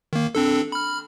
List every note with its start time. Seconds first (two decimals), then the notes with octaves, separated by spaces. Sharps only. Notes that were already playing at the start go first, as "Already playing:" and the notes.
0.13 D#3 A#3
0.35 C4 D4 A4
0.72 B5 F6